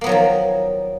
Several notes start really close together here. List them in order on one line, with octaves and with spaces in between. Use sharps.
A#3 B3 F#3 F3 D#3